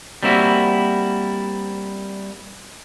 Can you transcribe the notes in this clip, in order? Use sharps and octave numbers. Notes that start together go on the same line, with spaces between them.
G3 A#3 C4 E4 F#4